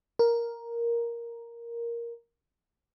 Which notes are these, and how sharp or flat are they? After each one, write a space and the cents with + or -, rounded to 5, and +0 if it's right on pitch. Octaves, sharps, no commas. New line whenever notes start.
A#4 +5